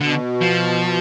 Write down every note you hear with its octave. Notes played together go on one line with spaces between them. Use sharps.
B2 D3
F3